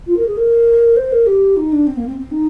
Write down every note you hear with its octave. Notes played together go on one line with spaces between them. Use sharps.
F4
A#4
G#4
A#4
C5
A#4
G4
D#4
D4
C4
A#3
C4
C4
D#4